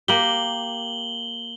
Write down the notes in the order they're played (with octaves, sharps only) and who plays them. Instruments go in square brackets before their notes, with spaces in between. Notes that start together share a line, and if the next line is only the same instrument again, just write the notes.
[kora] A#3 G4 [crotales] F#7 G7